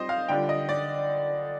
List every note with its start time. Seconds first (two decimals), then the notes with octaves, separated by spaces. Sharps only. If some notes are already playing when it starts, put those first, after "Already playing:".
Already playing: G3 C4 F4 C5 D#5
0.09 F5
0.28 D3 G3 D4 F4 G5
0.49 D#5
0.69 D5